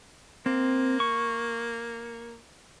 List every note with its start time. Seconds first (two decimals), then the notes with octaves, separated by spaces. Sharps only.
0.46 A#3 C4
1.00 C#6